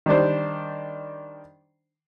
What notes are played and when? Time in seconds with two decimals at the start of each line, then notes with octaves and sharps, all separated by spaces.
0.06 D#3 G3 D4 C5